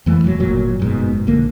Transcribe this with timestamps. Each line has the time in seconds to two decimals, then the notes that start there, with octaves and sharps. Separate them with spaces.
0.06 F2 E3 A3
0.24 E1 F#3
0.40 G1 A#2 F#3
0.80 F#1 G#2 B2
1.27 A#1 D3 A#3